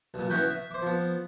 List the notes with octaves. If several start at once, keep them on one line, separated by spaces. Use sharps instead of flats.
B1 A#2
B3 C#4 E4 F#4 B4 G5
E5
C5 D6
F3 B3